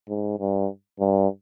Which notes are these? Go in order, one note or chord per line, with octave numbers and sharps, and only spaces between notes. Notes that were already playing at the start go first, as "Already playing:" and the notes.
G#2
G2
G2